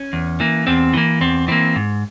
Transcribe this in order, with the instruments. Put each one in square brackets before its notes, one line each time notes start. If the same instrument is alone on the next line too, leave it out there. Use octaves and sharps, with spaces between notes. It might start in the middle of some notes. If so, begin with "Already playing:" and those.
Already playing: [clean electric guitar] C#4
E2
E3 A#3
E2 C4
E3 A#3
E2 C4
E3 A#3 C4
G#2